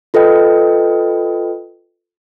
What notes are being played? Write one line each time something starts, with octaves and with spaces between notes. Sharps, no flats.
F4 A4 B4 D#5 G5